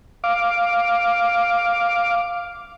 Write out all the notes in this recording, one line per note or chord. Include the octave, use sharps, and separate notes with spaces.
F5 D6